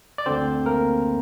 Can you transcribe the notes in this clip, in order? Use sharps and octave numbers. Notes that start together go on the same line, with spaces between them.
D5
D2 D3 C4 C5
A#3 A#4